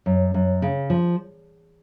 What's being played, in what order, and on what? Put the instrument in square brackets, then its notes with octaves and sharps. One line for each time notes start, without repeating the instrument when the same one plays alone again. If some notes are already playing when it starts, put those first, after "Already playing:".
[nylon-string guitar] F#2
F#2
C#3
F3